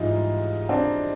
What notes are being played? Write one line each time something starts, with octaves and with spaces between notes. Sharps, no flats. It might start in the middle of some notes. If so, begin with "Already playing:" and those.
Already playing: G#2 E3 G3 D#4 F4
C4 D4